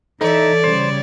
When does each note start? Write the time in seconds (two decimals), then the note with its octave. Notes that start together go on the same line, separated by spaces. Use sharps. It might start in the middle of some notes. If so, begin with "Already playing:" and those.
0.21 E3 D#4 A4 C#5 D5 E5
0.64 C#3 G3 C5